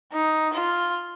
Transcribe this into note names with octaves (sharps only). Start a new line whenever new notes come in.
D#4
F4